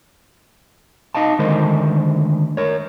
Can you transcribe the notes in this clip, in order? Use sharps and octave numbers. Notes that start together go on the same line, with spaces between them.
D#4 D#5 F5 A5
D3 D#3 G#3 A3 A#4 C5
A#4 C#5